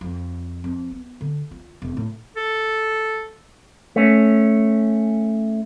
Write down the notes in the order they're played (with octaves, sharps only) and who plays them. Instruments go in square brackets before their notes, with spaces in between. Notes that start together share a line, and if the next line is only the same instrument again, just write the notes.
[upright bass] F2
F2
B3
D3
F4
E1
A2
[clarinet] A4
[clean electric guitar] A3 C#4